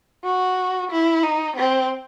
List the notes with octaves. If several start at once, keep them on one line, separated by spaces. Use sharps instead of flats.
F#4
E4
D#4
C4